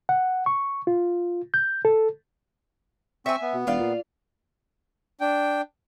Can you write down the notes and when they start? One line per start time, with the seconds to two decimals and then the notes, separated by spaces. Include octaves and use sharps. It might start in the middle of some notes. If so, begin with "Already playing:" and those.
0.09 F#5
0.46 C#6
0.87 F4
1.54 G6
1.85 A4
3.26 C4 E5 G#5 C#6
3.42 B3
3.53 B2
3.67 E1 F4 D5 F5
3.80 A#2
5.21 D4 G5